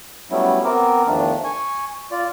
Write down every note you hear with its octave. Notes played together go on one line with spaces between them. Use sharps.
F#3 G3 A3 B3 C#4 E4
B3 C4 A#4 C5 D6
E2 D#3 F3 A3 D4
G#5 C#6
F4 D5